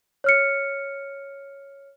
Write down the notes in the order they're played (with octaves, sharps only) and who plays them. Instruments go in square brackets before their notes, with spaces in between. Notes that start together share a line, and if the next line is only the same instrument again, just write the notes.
[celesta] C#5 F6 C#7